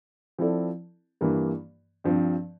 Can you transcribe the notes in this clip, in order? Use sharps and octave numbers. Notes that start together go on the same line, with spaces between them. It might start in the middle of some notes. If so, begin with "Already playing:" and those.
F3 C4 E4 A4 D5
G2 E3 G3 A#3
G2 F3 C4